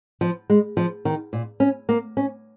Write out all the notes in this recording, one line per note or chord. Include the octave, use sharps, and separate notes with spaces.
F3
G#3
F3
D#3
A#2
C#4
A#3
C#4